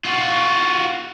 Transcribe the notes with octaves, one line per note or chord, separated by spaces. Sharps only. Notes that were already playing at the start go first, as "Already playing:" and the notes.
F4 F#4